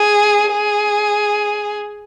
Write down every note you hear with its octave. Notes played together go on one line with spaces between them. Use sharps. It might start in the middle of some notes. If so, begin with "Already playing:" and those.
Already playing: G#4
G#4